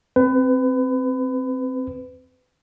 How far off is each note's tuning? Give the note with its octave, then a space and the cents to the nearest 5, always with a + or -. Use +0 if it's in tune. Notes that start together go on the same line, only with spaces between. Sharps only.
C4 +0 B4 +30